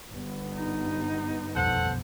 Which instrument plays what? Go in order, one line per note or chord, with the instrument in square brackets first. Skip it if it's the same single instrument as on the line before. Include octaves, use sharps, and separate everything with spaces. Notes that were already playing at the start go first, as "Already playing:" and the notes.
[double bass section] G1 B3
[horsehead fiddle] D#4
[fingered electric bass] E1 B1 F2 [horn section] A4 C5 F#5